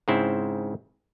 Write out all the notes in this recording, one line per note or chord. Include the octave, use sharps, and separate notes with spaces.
G#2 C#3 C4 E4